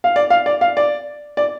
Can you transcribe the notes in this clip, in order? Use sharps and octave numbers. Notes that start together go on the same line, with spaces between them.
F5
D5
F5
D5
F5
D5
D5